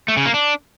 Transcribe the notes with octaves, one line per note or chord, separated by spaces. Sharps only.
A3
C#3
A#3
D4